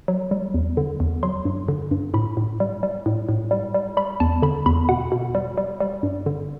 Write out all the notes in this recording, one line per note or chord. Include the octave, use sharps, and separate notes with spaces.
F#3
G3
E2
D3
E2
F#3 C6
G2
D3
G2
A2 B5
A2
G3
G3
A2
A2
G3
G3
G3 B5
E2 A5
D3 B5
E2 B5
B2 F#5
B2
G3
G3
G3
G2
D3